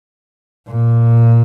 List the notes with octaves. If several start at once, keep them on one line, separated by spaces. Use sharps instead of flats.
A#2